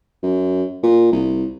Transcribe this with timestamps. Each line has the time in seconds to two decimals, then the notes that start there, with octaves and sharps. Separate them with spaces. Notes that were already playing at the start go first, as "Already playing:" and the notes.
0.23 F#2
0.83 A#2
1.12 C2